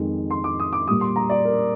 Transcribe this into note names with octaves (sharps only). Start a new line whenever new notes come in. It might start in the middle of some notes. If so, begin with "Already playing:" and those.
Already playing: F2 D#3 G#3
C6
D6
D#6
D6
A#2 G3 D#6
C6
A#5
D5
A#4